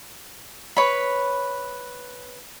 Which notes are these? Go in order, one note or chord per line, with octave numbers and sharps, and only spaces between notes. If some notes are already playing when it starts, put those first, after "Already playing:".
B4 C#5 B5